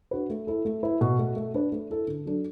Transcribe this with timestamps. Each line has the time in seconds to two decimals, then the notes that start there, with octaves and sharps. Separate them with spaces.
0.11 D4 F#4 B4
0.30 A3
0.47 E4 A4
0.65 A3
0.83 E4 B4
1.01 B2
1.18 A3 F#4
1.36 A3
1.54 D4 B4
1.72 A3
1.90 E4 A4
2.07 D3
2.25 F#3 D4 A4